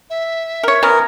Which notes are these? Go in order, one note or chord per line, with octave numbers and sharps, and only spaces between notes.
E5
A#4 C#5
E3 B3 C#4 A#4 D#6